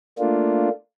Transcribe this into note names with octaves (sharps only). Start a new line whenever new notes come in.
A3 A#3 D4 F4